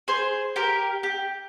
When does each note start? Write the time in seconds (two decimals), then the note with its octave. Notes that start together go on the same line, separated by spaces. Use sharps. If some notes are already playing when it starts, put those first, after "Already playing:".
0.08 G#4 C5
0.56 G4 A#4
1.03 G4